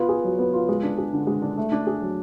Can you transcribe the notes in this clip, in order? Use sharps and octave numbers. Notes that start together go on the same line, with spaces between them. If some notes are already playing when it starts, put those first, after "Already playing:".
Already playing: B3 F4
G#4
F#3
B3
F4
G#3
D4
G#4
D3
G#3
D4
A3
D4
G#4
F#3